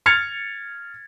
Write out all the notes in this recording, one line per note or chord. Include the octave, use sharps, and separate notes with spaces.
F6 G#6 A6 C#7 F7